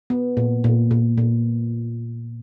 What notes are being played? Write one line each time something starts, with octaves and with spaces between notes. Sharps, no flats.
B3
A#2
A#2
A#2
A#2